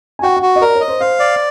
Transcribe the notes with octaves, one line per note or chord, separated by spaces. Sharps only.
G#5
F#4 G5
F#5
F#4
D#5
A#4 D5
C#5
D#5
C5
C5 F5
D5